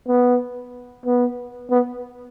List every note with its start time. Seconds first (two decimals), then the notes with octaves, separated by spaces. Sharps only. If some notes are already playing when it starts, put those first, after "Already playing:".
0.08 B3
1.06 B3
1.70 B3